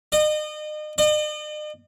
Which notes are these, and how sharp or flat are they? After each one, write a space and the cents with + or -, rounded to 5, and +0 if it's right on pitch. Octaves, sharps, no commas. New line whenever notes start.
D#5 -35
D#5 -45